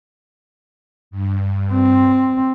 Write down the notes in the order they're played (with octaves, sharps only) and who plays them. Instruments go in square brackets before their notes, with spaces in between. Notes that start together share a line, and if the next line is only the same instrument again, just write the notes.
[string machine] G2
[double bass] C4